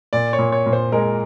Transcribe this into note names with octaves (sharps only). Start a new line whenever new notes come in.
A#2 D5
C#5
A#2
C#5
A#2
C5
G#3 A#4